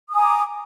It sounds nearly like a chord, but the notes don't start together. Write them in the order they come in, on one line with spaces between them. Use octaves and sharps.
D#6 G#5 A#5 D6